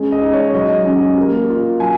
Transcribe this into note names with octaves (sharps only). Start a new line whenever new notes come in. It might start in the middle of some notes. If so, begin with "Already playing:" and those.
Already playing: G#3 C#4
D#5
D#4
C#5
F#3 D#5
C#4
A#3
F4
F#3 G#5